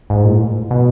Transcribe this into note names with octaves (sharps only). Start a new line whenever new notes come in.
G#2
A#2
A2
B2